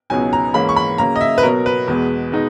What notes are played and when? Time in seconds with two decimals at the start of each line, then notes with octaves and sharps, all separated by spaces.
0.10 C#2 B2 F#3 B3 D#4 G#5
0.33 A#5
0.54 G#2 E3 A#3 C#4 B5
0.69 C#6
0.76 B5
0.98 C#3 F#3 A#3 C#4 A#5
1.16 D#5
1.21 E5
1.38 B4
1.43 B2 F#3 B3 A#4
1.66 B4
1.88 E2 B2 G#3
2.32 B2 G#3 D#4